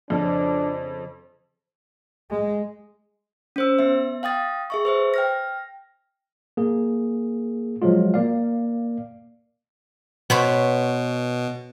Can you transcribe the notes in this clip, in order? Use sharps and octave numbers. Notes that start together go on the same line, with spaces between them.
F2 C#3 F3 D4
G#3
C#4 C5 E6
B3 E5
F5 G5 D#6 A6
G#4 E5 C#6
B4 C5 E5
G5 F6 A#6
A#3 G#4
F3 F#3 G#3 F4
A#3 D5 F5
B2 B3 C5 C#5